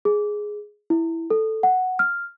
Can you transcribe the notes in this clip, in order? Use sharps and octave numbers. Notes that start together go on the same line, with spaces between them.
G#4
E4
A4
F#5
F6